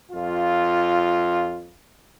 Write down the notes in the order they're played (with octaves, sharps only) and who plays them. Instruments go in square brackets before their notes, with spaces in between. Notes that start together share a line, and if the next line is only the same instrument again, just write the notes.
[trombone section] F2 F4